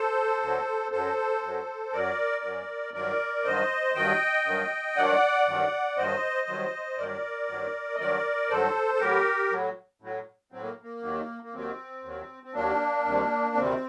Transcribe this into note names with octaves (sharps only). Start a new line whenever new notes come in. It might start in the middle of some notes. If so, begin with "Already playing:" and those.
Already playing: A4 C5
D2 D3 F#3
F#2 F#3 A4 C5
F#2 F#3
F#2 F#3 A#4 D5
F#2 F#3
G2 D#3 F#3 A#4 D5
G2 D#3 F#3 C5 D#5
G2 D#3 F#3 D#5 G5
G2 D#3 F#3
G2 D#3 F#3 D5 F#5
G2 D#3 F#3
G2 D#3 F#3 C5 D#5
G2 D#3 F#3
G2 D#3 F#3 A#4 D5
G2 D#3 F#3
D#5
G2 D#3 F#3 A#4 D5
G2 D#3 F#3 A4 C5
A4
A2 F#3 G4 A#4
A2 F#3
A2 F#3
A2 F#3 C4
A#3
A#3
D#2 D#3 F#3
A#3
D#2 D#3 F#3 C4
D#2 D#3 F#3
C4
D#2 D#3 F#3 A#3 D4
D2 C3 D#3 G3
D2 C3 D#3 G3 C4